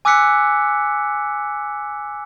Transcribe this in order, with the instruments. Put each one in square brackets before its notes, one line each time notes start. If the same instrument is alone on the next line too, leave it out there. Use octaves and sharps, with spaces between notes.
[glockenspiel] G#5 D6 E6 F#6 B6 C#7